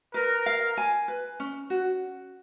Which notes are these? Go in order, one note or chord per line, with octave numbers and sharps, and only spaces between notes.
A#4 B4
F5
G#5
B4
C#4
F#4